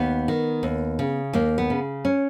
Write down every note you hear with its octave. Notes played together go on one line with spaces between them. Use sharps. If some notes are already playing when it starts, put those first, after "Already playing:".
Already playing: D#2 B3
D#3
D#2
C#3
D#2 A#3
B3
C#3
C#4